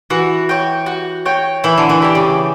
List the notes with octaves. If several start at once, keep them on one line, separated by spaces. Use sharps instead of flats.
E3 F#4
C#5 G5
F#4
C#5 G5
E3 E4
D3
E3
G4 D5
C#3